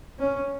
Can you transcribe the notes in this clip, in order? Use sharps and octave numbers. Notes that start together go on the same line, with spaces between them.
C#4